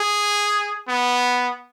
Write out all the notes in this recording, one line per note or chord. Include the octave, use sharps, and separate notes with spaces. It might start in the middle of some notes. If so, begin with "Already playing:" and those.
Already playing: G#4
B3